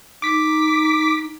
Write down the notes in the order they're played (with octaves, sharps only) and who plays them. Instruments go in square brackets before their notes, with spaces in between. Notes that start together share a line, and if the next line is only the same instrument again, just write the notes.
[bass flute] D#4 [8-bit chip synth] D6 B6